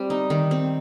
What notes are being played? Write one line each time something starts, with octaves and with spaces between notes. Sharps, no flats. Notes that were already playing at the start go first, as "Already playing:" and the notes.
Already playing: G3 C4
D#4
D#3
C4